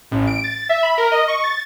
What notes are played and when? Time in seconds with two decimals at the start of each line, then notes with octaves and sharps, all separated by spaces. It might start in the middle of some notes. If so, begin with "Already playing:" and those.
0.11 A1
0.27 D7
0.44 A6
0.69 E5
0.83 B5
0.98 A#4
1.12 D#5
1.28 C#6
1.44 A6